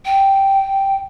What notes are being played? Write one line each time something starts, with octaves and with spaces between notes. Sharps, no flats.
G5